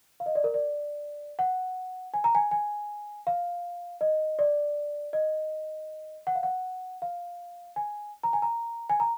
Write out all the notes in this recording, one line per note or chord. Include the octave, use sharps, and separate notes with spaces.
F5
D#5
D5
A#4
D5
F#5
G#5
A#5
G#5
G#5
F5
D#5
D5
D#5
F#5
F5
F#5
F5
G#5
A#5
G#5
A#5
G#5
A#5